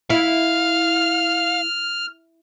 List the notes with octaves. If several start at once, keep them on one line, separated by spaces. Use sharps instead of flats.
E4 F5 F6